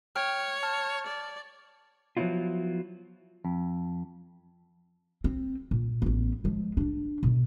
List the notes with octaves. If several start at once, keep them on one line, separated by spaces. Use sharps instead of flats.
C#5 G5 F6
A5 F6
D5
F3 F#3 B3 C#4 E4 F4
F2
C4
A#2
A1 B3
F3 G#3
D3 D4
B2 D3